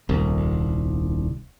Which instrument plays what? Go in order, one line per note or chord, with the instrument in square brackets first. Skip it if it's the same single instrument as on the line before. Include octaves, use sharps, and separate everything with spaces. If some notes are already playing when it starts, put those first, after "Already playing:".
[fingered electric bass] D#1 C2